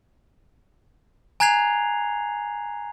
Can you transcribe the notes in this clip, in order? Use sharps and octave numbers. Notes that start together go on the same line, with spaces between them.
G#5 A#5 F#6 G#6 C7 F7